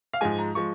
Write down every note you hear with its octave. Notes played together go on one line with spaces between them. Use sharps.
F5
G#2 F3 G#3 G#5
A#5
F3 G#3 C#6